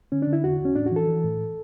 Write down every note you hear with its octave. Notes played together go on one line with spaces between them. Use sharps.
D3 C#4
D4
D3
E4
E2 F#4
E2 C#4
A2 D4
F#4
E3 A4
E3
A2